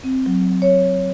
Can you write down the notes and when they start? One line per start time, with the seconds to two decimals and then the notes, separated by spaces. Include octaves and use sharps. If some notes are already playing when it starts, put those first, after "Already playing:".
0.04 C4
0.26 F#3
0.62 C#5